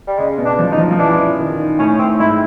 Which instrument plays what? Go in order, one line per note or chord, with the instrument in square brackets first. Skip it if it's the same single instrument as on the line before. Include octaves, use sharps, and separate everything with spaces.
[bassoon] G3
[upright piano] C#3 [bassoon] G#3
[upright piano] B2
[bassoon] D4
[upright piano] F3
[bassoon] D#4
[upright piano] F3
F3
[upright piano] E3 [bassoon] D4
[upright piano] D#3
[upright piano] A2 [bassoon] C#4
[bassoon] C4
[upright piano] G#2 [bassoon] E4